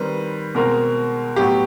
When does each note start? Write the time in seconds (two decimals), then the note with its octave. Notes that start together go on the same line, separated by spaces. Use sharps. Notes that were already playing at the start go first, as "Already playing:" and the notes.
Already playing: D#3 G3 C4 B4
0.55 B2 G#3 C4 A#4
1.36 A2 F#3 B3 G4